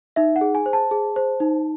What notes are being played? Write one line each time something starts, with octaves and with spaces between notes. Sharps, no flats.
D#4 E5
F#5
G#4
G#5
C5
A5
G#4
C5
D#4